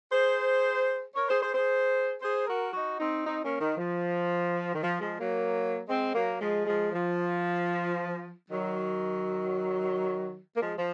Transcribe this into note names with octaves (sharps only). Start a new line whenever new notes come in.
G#4 C5
A#4 C#5
G#4 C5
G#4 C5
G#4 C5
G#4 C5
F#4 A#4
D#4 F#4
C4 D#4
C4 D#4
A#3 C#4
D#3
F3
D#3
F3
F3 G#3
F#3 A#3
G#3 C4
F#3 A#3
F3 G#3
F3 G#3
F3
D#3 F#3
A#3
F3 G#3
F3